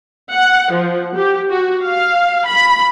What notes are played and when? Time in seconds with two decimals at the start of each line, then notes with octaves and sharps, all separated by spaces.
0.33 F#5
0.73 F3
1.16 G4
1.50 F#4
1.87 F5
2.47 B5